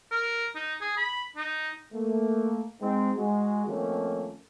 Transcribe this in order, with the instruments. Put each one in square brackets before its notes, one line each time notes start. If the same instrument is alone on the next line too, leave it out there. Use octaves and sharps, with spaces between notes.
[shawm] A#4
D#4
G#4
B5
D#4
[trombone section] A3 A#3
G#3 C4 D#4
G#3 F#4
D#3 F3 A3 A#3 C4 C#4